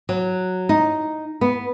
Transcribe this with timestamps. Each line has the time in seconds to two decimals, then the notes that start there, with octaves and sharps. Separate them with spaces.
0.09 F#3
0.69 D#4
1.41 B3